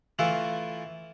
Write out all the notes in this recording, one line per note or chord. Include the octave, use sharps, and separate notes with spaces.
E3 A3 E4 F4 B4